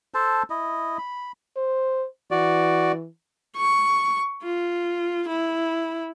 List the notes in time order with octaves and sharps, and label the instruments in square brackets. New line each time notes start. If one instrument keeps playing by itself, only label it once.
[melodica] A4 C5 A5
E4 D#5
B5
[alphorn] C5
[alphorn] E3 [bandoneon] F#4 D5
[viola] C#6
F4
E4